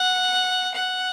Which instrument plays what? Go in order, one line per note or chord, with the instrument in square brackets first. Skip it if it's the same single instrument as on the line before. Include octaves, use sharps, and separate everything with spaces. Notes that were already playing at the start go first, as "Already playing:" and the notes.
Already playing: [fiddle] F#5
F#5